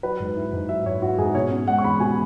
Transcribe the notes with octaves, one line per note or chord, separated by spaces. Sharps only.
F#3 B4
G#2
E4
G#2
F#3 E5
G#2 C#5
E4 F#4
G#2 G#4
B2 C#5
C#4
G#3 F#5
C#6
E2 B5
B2 G#5